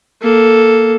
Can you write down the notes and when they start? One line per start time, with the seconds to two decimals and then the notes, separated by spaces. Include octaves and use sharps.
0.22 A#3 A4